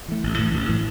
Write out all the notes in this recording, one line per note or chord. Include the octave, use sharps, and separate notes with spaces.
E3 A3
A1
A2 E3
A1
A2 E3